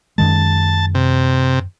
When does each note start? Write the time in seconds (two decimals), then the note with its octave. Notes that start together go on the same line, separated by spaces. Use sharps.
0.18 F#2 D#3 G#3 A5
0.95 C3